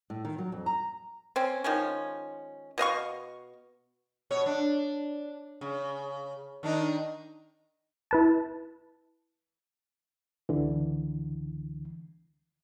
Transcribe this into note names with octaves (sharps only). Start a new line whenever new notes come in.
A2
D#3
F#3
F2
A#5
C4 C#4
D#3 F3 G#3 C#4
B2 D#5 F5 C#6
B2 C#5
D4
C#3
D#3 D4 D#4
E4 B4 A5
C#2 D3 E3